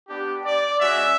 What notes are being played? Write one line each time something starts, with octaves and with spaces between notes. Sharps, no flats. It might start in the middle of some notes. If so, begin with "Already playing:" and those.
B3 D4 G4
D5
G#3 C#4 F#4 E5